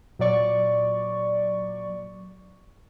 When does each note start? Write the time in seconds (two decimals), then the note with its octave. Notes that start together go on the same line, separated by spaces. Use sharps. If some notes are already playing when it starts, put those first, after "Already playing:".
0.19 A#2 F#3 D5 C#6